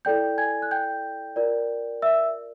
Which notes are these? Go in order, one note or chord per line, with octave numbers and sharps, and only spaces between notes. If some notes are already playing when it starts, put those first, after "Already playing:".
E4 A4 D5 G5 G6
G#5 G#6
F#6
G5 G6
F4 A#4 D5
E5 E6